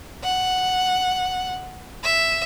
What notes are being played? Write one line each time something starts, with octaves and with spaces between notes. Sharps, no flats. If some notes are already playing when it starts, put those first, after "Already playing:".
F#5
E5